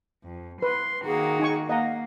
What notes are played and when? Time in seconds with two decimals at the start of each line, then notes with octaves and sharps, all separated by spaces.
0.24 F2
0.62 B4 C6
1.06 D#3 A#3 F#4 G#4
1.40 D#4 G#5 C#6
1.69 A#3 D#5 F5 F#5 A#5